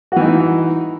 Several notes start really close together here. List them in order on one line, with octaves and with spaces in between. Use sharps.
F#4 E3 D#4